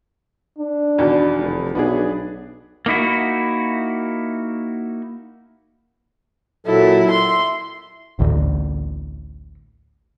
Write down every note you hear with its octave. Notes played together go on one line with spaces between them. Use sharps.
D4
E2 B2 D#3
F1
B1 B3 D4 G#4
A#3 D#4 E4 F#4
A#2 F#3 E4 A4
E5 C6
A1 D2 A2 D3